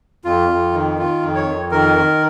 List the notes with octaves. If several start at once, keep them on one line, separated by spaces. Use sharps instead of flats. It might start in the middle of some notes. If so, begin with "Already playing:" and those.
F2 F4
F2
D#3
D#3 F4
F2
C#5
F2
D#3 A#4
D#3